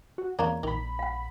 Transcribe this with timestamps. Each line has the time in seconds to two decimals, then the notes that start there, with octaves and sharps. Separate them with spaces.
0.18 F#4
0.39 E2 A#3 C#4 D5 A#5
0.63 A#1 D#3 B5
0.99 F5 F#5